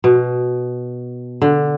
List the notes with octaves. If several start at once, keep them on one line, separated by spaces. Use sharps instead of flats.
B2
D3